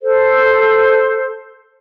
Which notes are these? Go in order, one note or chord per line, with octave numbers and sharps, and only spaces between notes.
A4 C5